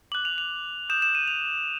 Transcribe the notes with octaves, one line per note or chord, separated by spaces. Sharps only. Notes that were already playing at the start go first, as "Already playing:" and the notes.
D6 F#6 F#7
F7
F7
D#6 G6 E7
E7
D#7
F7